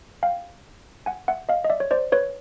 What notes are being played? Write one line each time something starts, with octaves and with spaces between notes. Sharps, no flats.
F5 G5
F#5 G#5
E5 F#5
D#5 F5
D#5
D5 E5
C#5
C5 D5
B4 C#5